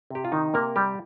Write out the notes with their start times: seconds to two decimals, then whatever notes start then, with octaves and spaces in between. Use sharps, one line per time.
0.10 C3 G4
0.25 F4
0.32 D#3 D#4
0.54 C3 A#3 A#4
0.76 G3 G4